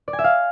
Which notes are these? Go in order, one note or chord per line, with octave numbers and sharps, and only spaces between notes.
D5
G#5
E5
F5